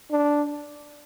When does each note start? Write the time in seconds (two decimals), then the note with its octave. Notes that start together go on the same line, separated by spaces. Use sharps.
0.11 D4